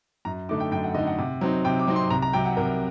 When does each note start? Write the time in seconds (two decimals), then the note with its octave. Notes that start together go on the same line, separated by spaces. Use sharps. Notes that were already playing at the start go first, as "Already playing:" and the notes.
0.25 F#2 A#5
0.49 D3 A3 D#4 D6
0.60 G5
0.71 F#2 G5
0.84 F#5
0.94 D3 A3 D#4 D#5
1.07 F#5
1.18 C3
1.41 F#3 C4 D#4
1.65 C3 G5
1.79 D6
1.87 F#3 C4 D#4
1.96 C6
2.10 C2 A#5
2.22 A#5
2.33 C3 F#3 G5
2.45 F#5
2.57 C2 A#4